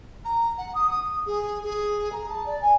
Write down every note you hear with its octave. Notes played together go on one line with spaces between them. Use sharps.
A#5
F#5
D#6
D#6
G#4
G#4
A#5
A5
D5
G#5